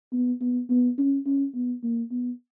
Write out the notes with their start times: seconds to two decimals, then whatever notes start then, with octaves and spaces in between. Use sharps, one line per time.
0.13 B3
0.41 B3
0.70 B3
0.98 C#4
1.26 C#4
1.54 B3
1.83 A#3
2.11 B3